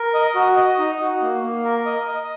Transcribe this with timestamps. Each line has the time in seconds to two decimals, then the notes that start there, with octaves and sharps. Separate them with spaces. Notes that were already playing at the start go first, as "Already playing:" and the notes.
Already playing: A#4
0.14 D#5
0.35 F#4
0.57 D#5
0.78 D#4
1.00 F#4
1.22 A#3
1.43 A#3
1.64 A#4
1.86 D#5
2.08 D#5